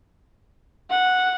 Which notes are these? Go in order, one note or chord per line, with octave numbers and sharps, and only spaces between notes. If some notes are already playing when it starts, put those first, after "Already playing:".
F#5